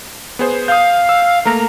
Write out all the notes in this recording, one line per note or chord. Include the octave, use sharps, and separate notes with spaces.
B3 G#4 C5
F5 D#6 G6
E6
A3 A#3 A#4 A#5